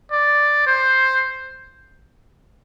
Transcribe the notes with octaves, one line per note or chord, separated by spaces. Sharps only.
D5
C5